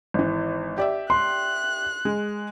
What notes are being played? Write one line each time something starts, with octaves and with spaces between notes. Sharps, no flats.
G#1 E3
G4 D5 E5
C6 F#6
G#3